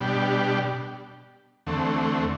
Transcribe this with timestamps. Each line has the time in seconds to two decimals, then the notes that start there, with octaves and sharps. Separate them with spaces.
0.01 B2 G3 D4 G4
1.67 E2 D3 A3 C4